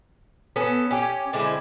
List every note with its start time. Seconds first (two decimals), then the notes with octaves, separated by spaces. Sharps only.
0.56 B3 C#4 A4
0.91 C#4 G4
1.33 D3 G#3 C4 E4